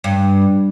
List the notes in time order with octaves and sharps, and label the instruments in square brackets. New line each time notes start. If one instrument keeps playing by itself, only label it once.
[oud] G2